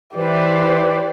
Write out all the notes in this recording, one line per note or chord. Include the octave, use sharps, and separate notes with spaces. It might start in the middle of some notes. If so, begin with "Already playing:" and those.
E3 E4 G4 B4 C5 D5